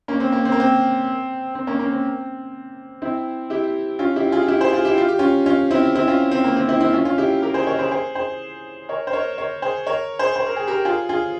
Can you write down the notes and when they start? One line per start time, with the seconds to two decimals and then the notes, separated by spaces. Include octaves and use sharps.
0.08 A#3 C#4
0.20 C4
0.32 A#3
0.45 C4
0.52 A#3
0.60 C4
1.55 C4
1.67 A#3 C#4
1.79 A#3 C#4
1.92 C4
3.02 C4 E4
3.50 E4 G4
3.99 C#4 F4
4.16 E4 G4
4.32 F4 G#4
4.42 F4
4.48 E4 G4
4.61 G#4 C5
4.73 F4 G#4
4.85 E4 G4
4.98 F4
5.09 G4
5.19 C#4 F4
5.46 C#4 F4
5.71 C4 E4
5.95 C4 E4
6.07 C#4 F4
6.31 C4
6.44 A#3
6.57 C4
6.69 C4 E4
6.80 C4 E4
6.93 C#4 F4
7.05 C#4 F4
7.18 E4 G4
7.42 G4 A#4
7.54 G#4 C5
7.67 A#4 C#5
7.79 G#4 C5
7.91 G#4 C5
8.15 G#4 C5
8.89 A#4 C#5
9.07 C5
9.13 A#4 C#5
9.38 A#4 C#5
9.62 G#4 C5
9.87 A#4 C#5
10.19 G#4 C5
10.36 C5
10.46 A#4
10.56 G#4
10.67 G4 A#4
10.85 F4 G#4
11.09 F4 G#4